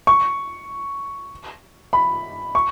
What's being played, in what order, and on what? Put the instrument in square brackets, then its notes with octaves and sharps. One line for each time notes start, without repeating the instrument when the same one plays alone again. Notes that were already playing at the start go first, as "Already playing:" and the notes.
[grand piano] C#6
B5
C#6